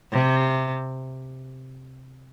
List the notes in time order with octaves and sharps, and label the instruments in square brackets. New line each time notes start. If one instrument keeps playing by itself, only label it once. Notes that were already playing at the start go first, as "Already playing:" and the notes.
[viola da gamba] C3